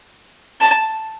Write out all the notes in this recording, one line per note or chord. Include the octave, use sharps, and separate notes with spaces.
A5